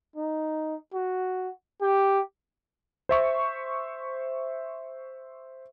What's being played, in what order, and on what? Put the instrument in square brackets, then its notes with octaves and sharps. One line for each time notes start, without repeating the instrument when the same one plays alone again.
[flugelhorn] D#4
F#4
G4
[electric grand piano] C5 E5 C#6